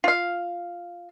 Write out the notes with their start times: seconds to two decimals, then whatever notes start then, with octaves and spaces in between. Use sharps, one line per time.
0.04 F4 F5